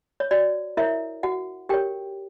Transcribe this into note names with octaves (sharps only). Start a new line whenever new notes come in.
C#5
F#4 D5
E4 A#4 C#5 E5
F#4 F#5
G4 A#4 C#5 G5